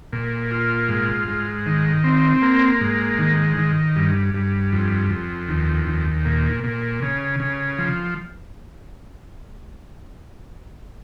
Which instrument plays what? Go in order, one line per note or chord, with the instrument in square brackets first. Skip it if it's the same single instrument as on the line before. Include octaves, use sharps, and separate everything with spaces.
[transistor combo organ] A#2
F4
G#2
G#2
D#3
C4
A#3
G#2
D#3
D#3
G2
G2
F2
F2
D#2
D#2
A#2
A#2
C#3
C#3
F3